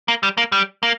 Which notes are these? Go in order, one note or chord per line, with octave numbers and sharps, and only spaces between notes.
A#3
G3
A#3
G3
A#3